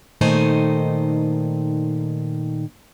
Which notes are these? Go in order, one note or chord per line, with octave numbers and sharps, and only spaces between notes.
A#2 D#3 A3 D#4 C5 G#5